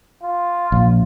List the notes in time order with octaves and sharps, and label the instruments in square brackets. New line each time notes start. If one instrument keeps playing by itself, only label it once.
[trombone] F4
[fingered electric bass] A#1